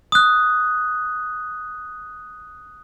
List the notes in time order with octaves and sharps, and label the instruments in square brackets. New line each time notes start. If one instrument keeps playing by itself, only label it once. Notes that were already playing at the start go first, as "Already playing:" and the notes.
[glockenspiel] D#6 F#6